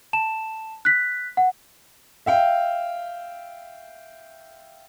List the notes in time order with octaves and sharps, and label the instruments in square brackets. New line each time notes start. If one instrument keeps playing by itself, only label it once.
[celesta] A5 E7
F#6 B6
F#5
[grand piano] E5 F5 G5